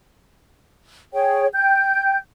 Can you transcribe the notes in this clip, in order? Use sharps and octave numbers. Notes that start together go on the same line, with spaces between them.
G#4 C#5 G5
G5 G6